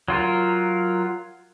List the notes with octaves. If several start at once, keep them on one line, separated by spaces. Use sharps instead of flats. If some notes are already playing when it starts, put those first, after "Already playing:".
F#3 F4 A#4